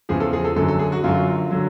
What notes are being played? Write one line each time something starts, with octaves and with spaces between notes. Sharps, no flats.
E2 C#3 F3 G#4
A4
G#4
A4
F#2 D3 F#3 A4
A4
G#4
F#4
F#2 D3 F#3 F4
D3 F#3